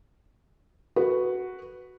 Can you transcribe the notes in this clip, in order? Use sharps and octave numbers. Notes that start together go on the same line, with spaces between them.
F#4 B4